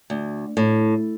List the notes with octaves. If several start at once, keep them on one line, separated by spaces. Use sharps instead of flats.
D2
A2